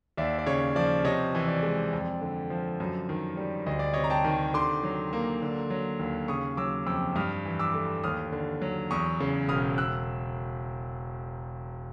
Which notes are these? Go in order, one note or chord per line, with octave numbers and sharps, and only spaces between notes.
D#2 D5 E5
D5
C#3 C#5
F3 D5
C3 C#5 D#5
E3
D5
G#3
F2
D3
F3
F#2
D#3
G3
D2 D#5
D5
C3 C#5 D#5
A#5
G5 A5
D#3
D3 C6 D6
F#3
A#3
D3
F#3
D#2
C#3 C#6 D#6
F#3 D6 E6
F2 D6 E6
G2 D#6 F6
E3
D6 E6
A3
D#2 D#6 F6
D3
F#3
E2 C#6 D#6
C#3
E1 D#6 F6
E6 F#6